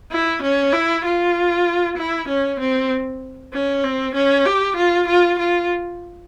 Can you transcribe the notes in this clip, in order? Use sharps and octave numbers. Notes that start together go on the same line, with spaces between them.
E4
C#4
E4
F4
E4
C#4
C4
C#4
C4
C#4
G4
F4
F4
F4